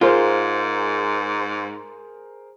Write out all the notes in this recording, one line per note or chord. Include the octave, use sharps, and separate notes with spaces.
G#2 F4 G#4 A#4 C5